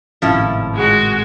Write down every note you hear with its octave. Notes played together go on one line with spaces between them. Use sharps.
G#1 A2 C3 F3 C#4 E4
G#3 F#4